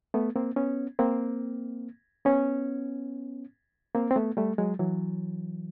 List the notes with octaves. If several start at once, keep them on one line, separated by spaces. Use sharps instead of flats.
A3 B3
A#3 C4
B3 C#4
A#3 C4
B3 C#4
A#3 C4
C4
A3 B3
G3 A3
F#3 G#3
E3 F#3